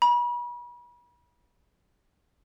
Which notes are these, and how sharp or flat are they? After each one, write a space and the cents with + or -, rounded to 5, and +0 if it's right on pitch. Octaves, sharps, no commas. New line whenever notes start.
B5 -40